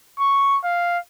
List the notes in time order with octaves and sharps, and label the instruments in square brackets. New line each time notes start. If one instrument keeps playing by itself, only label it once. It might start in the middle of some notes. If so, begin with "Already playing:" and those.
[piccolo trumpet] C#6
F5